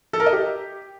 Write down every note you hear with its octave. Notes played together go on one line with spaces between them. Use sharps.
A4
A#4
D#5
G4